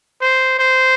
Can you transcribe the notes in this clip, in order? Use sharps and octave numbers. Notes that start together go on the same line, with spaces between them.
C5
C5